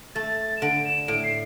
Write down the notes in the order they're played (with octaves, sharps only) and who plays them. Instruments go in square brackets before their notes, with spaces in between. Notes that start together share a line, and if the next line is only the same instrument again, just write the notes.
[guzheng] A3 [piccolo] A6
[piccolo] E7
[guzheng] D3 [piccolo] D7
[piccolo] E7
[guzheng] A2 [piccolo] D7
[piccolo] C7